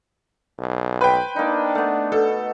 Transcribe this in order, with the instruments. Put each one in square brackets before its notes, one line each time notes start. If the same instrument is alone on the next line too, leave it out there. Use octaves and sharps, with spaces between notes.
[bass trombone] B1
[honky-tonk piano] B4 G5 [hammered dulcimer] C5 B5
[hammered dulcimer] A#3 D#4 [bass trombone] D4
[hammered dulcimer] A3 B3
[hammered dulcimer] B2 [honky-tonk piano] A4